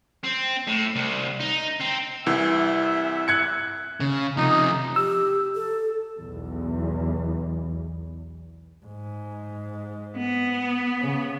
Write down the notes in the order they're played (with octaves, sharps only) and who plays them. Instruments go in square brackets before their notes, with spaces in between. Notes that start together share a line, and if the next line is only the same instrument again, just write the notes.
[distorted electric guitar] C4
A2
C2
D#4
C4
[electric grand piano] C2 E3 [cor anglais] E5
[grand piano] F#6 G#6 C#7
[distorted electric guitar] C#3
[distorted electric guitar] C3 F3 [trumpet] D#4
[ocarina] G4 [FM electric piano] E6
[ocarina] A4
[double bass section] B1 E2
[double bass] G#2
[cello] B3
[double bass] C#3